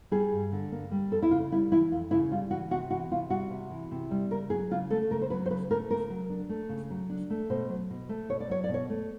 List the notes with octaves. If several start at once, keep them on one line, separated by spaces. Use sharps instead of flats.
G3 G#4
G2
D3
A#3
G3
F2 A4
E4
C#3 F4
G3 E4
E3 E4
F2 F4
C#3 E4
G3 F4
E3 F#4
C3 F#4
E3 F#4
C3 F4
G3 F#4
C3
E3
C3
G3
C#3 A#4
F#3 G#4
C#3 F4
A3 A4
C#3 A#4
C5
F#3 B4
C5
C#3 B4
A3 A#4
C#3 A#4
F#3
D4
A3
C#3
F#3
D4
A3
B2 C5
F#3
B2
A3
B2 C#5
D5
F#3 C#5
D5
B2
C#5
A3